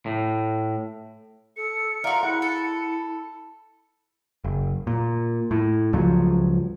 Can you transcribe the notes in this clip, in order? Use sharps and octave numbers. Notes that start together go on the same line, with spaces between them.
A2
A4 C#7
F4 F#4 A#4 D5 E5 F5
E4 G#4 E5 F#5
A4
F#1
A#2
A2
C#2 G2 F3 F#3